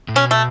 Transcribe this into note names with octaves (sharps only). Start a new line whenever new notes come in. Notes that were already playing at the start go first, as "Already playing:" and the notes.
A2
B2 C#4
A3